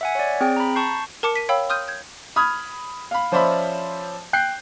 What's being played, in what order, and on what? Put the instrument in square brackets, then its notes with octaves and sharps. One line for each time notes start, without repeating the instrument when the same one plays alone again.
[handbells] E5 F#5 G#5
C#5 D5
C4 G#4 G5
A#5 B5
A5 C#6 G6 C7
[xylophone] A#4 A5 D6 C#7
B6 D#7
C#5 F5 G5 B5 E6
C6 D#6 F6 G6 D#7
G6 G#6
[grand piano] B5 D#6 F6 G#6
F5 B5
F3 C#4 C5 D5 E5 B5
G5 F#6 G6 C7